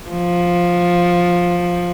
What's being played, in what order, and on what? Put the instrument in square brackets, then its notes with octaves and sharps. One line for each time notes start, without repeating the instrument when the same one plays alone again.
[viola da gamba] F3